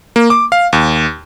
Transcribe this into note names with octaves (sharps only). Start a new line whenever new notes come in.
A#3
D6
F5
D#2